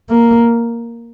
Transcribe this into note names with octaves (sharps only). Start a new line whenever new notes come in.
A#3